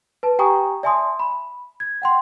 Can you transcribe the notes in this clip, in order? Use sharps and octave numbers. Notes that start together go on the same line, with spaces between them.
B4 A5
G4 G5 G#5 A#5 C#6 D#6
D5 E5 G#5 A5 C6 D#6
B5
G#6
F#5 G5 C6